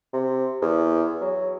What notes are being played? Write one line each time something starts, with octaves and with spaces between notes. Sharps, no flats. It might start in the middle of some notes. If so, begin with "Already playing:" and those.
C3
E2
F#3